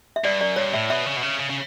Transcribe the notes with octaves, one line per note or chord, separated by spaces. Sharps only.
E5
G2 D5
F#2 D5
G2 C#5
A2 E5
B2 E5
C#3
B2
C#3
C#3
C#3